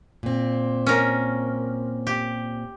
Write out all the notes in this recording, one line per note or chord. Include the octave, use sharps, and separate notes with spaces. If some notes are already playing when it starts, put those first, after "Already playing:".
A#2 C4
C#4 A#4
G4